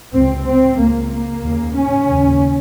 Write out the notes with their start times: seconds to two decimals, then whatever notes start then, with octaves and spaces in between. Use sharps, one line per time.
0.14 C#2 C3 C4
0.46 C4
0.78 C#2 C#3 A#3
1.11 A#3
1.43 D#2 C#3
1.75 C#4
2.07 D#2 C#3